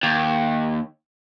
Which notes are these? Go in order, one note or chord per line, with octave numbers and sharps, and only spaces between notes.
D#2